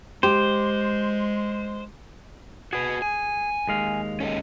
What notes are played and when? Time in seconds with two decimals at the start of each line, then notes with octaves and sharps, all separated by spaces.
0.23 G#3 G4 C5
2.73 F#4 G#4 B4
3.02 G#5
3.67 D#2 G#3 F5
4.20 C#4 A4 D#5